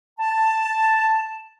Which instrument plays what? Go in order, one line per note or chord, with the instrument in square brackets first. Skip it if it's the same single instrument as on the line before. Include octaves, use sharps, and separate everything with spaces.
[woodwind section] A5